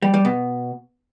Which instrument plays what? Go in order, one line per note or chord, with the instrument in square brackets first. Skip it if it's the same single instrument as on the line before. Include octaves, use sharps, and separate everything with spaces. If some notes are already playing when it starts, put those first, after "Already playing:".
[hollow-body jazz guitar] G3
G3
B2